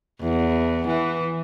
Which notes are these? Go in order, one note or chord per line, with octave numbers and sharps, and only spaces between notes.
E2
E3